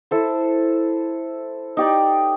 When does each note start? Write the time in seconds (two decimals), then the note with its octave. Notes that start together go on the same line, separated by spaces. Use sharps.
0.11 E4 A4 C5
1.77 D#4 G4 D5